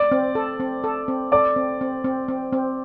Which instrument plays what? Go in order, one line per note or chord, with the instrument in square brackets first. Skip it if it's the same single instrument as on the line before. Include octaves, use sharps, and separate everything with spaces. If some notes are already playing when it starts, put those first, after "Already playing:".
Already playing: [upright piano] D5 D6
[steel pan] C4
A4
C4
A4
C4
[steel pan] A4 [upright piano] D5 D6
[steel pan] C4
C4
C4
C4
C4